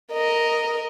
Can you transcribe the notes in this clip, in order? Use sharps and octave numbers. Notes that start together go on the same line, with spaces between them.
A#4 D#5